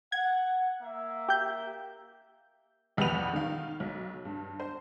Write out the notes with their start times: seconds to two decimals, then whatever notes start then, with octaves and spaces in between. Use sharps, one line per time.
0.12 F#5 G#6
0.81 A#3 E5
1.28 G4 G6
2.97 A#1 E2 G3 B4 F#5 F7
3.33 D#3 F5
3.80 B1
4.25 G2
4.60 C5